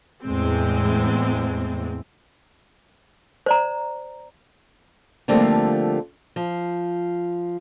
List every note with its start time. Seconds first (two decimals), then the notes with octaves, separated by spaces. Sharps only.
0.24 E2 A2 G#3 C4
3.46 C5 D5 A#5
5.28 D3 F3 G3 A3 A#3 C4
6.36 F3